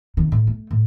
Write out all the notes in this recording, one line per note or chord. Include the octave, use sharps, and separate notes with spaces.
C3 D#3
A2
A3
A2